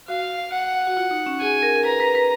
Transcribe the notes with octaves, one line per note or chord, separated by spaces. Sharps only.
F#4 F5
F#5
F#4
F4
D#4
C#4
G#4 G#5
A#4
A#4
B4 A#5
B4
B4